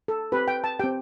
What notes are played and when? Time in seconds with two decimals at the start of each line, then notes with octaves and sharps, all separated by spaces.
0.08 A4
0.32 C4 G4 B4
0.48 G5
0.64 A5
0.79 C4 G4 G5